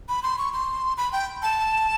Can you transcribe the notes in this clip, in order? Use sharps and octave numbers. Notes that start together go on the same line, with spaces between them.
B5
C6
C#6
C6
B5
G5
A5